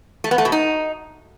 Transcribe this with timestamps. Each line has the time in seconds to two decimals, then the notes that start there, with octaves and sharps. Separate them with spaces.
0.24 A3
0.31 B3
0.38 A3
0.45 B2
0.52 D#4